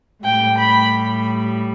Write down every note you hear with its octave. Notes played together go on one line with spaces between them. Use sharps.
A2 G3 G5
B5